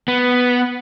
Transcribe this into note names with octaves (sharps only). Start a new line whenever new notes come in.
B3